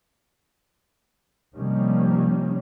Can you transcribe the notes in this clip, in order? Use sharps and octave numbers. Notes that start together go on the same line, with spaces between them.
C3 D#3 F3 G3 A#3 C#4